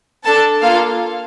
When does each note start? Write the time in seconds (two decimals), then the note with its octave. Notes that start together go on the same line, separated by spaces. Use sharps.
0.24 D4 A4 A5
0.61 A#3 F4 A4 F5